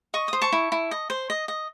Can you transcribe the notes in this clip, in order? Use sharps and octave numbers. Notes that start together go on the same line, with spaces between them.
D#5 C#6
C5 D#6
A5 C#6
E4
E4
D#5
C5
D#5
D#5